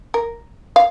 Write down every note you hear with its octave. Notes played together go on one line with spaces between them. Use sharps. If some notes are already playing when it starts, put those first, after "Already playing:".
A#4
F5